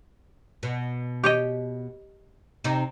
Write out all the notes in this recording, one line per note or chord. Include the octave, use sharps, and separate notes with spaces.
B2
G4 C#5 D#5
C3 C4 D#4